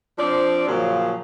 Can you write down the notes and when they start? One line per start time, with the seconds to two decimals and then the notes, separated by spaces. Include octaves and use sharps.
0.19 F3 C4 D4 D5
0.67 A#2 C#3 F3 F#3